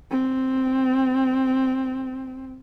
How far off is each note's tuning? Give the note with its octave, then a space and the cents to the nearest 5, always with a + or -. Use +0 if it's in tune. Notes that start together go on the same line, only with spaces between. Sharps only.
C4 +0